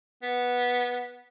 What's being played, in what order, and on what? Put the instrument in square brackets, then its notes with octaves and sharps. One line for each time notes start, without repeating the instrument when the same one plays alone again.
[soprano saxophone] B3